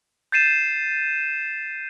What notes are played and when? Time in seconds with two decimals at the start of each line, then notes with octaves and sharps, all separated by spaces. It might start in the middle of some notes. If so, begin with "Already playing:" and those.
0.32 G6 A6 C7 D#7 E7